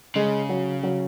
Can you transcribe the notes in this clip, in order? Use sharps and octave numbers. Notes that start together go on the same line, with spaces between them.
C#3 G#3
F#3
F#3